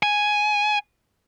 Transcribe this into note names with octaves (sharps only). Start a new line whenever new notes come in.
G#5